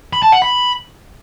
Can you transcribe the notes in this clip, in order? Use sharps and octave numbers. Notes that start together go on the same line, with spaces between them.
B5
A5
F#5
B5